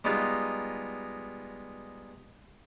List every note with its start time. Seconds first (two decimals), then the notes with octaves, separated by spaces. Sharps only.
0.04 G3 G#3 B3 D#4 F4